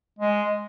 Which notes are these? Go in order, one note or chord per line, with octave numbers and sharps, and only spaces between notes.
G#3